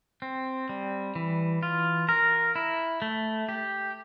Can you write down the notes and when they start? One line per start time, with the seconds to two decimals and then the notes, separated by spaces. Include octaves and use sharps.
0.22 C4
0.69 G3
1.15 E3
1.63 F4
2.09 A#4
2.56 E4
3.02 A3
3.49 G4